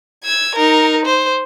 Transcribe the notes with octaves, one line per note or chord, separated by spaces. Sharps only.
E6 G#6
D#4 A#4
C5